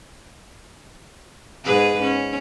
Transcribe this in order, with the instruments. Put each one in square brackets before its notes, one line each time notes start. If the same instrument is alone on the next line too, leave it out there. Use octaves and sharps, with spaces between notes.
[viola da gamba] G#2 G#4 B4
C#4